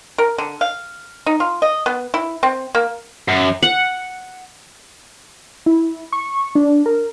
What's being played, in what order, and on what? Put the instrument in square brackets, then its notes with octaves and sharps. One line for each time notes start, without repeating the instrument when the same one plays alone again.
[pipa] A#4
D3
F5
D#4
F4
D#5
B3
E4
C4
A#3
[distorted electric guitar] F#2
[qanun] F#5
[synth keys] E4
C#6
D4
A#4